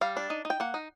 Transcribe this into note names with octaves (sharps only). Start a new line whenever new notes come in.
G3 F5
D4
D#4
D#4
G5
A#3 F#5
D#4